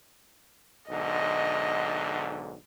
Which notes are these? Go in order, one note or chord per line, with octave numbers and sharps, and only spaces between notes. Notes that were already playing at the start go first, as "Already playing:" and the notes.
B1 G#2 D3 D#5